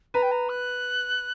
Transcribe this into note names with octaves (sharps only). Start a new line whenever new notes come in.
B4 A#5
G5
A#5
F#6